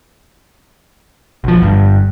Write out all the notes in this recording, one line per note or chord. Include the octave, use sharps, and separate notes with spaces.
B1 F3
G1 G2